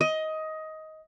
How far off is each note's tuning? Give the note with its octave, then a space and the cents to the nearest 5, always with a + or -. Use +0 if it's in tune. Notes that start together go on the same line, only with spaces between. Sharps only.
D#5 +15